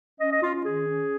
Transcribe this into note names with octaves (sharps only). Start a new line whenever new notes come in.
C#4 D#5
D#5
C#4 F4
F4
D#3 G#4
C#4